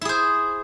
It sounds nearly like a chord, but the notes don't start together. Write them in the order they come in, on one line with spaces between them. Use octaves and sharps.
E4 G#4 C5